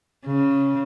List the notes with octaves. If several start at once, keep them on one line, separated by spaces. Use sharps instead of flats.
C#3